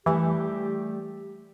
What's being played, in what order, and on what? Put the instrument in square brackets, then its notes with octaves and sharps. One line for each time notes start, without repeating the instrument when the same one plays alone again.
[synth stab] E3 [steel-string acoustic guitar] G3 A3 [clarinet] G4